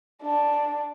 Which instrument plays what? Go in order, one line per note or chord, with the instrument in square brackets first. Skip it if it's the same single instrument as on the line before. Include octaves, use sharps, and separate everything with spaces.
[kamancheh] D4